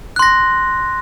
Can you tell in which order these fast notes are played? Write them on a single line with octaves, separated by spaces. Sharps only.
F#6 C6 A#6